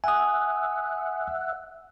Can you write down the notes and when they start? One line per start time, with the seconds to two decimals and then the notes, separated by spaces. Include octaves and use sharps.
0.04 E5 F#5 G#5 D#6